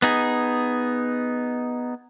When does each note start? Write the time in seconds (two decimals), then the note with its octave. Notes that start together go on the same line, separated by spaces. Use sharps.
0.02 B3 D#4 G#4